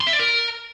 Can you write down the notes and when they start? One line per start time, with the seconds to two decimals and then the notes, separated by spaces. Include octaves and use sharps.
0.01 C6
0.07 E5
0.13 D5
0.19 A#4